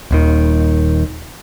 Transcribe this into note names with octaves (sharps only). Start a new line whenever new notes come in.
D#1 D#2 D#3